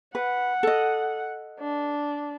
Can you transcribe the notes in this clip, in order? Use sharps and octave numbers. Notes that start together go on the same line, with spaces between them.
B4 F#5
A4 D#5
D4